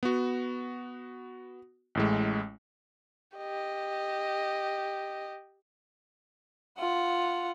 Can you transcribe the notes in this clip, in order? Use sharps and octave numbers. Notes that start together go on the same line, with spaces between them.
B3 F#4
A1 A2 G#3
G4 D#5
F4 F#5